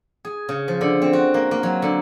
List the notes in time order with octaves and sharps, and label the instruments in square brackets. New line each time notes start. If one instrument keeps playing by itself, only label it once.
[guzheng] G#4
C#3
F3
D3
C4
F#4
A#3
A#3
F#3
D3